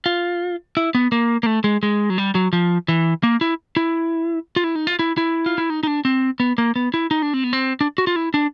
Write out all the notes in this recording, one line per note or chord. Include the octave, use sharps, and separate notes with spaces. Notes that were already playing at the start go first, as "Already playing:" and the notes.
F4
E4
B3
A#3
A#3
A3
G#3
G#3
F#3
G3
F#3
F3
E3
A#3
E4
E4
F4
E4
D#4
F4
E4
E4
F4
E4
D#4
D#4
D4
C4
B3
A#3
B3
E4
D#4
D4
C4
B3
C4
D4
F#4
F4
E4
D4